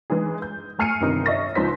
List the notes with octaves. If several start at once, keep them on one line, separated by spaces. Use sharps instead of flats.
E3 G#3 D#4 G#4
G6
A3 G#5 F6 C7 C#7 D#7
G1 C3 D#3 D#4
C#5 D#5 E5 C#6 A#6
C#2 F3 D#4 C5 B6